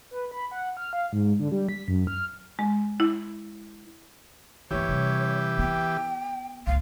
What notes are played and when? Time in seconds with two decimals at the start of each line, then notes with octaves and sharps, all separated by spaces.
0.11 B4
0.31 B5
0.51 F#5
0.77 F6
0.93 F5
1.13 G#2
1.40 D3
1.52 G3
1.69 B6
1.88 F#2
2.07 F6
2.59 G#3
3.00 E4
4.71 G1 E3 G#3 G4 C#5
4.88 C3 G3
5.59 B3 G5
6.67 D1 C#2 F5